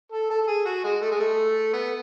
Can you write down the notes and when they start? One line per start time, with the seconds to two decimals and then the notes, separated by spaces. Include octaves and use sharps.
0.12 A4
0.30 A4
0.42 A4
0.47 G#4
0.65 F#4
0.84 G#3
1.01 A3
1.12 G#3
1.20 A3
1.73 B3